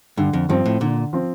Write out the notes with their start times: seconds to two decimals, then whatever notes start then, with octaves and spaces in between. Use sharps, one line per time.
0.17 G2 D3
0.33 F2
0.49 G2 F3 C4
0.66 A2
0.81 A#2 D3
1.13 F3 C4